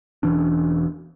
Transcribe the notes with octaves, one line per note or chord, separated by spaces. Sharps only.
E1 E3 C#4 D4